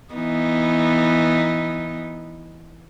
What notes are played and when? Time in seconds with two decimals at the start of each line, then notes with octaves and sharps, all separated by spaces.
0.14 E3 B3 D#4